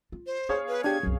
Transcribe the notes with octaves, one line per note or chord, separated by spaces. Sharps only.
F4
C5
B3 G#4 C#5 F5
B4
D4 G4 G#6
C2 F#2 B2